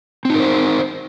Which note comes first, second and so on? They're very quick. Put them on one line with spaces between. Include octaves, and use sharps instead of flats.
C4 D#4 A#4 C5